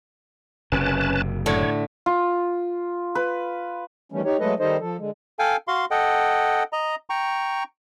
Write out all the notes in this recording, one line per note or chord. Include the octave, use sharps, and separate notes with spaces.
F#1 C3 C#4 B4 A5
A2 D3 A3 C#5
F4
B4
D#3 E3 G3 A3 C#4
D#4 G4 C#5
F#3 G#3 A3 A4 B4 D#5
D#3 G3 D#4 A4 C5 D#5
F3 A4
D3 G#3
A4 F5 G5 G#5
F#4 F5 C6
A4 D#5 F#5 G5
D#5 A#5
G5 A#5 C#6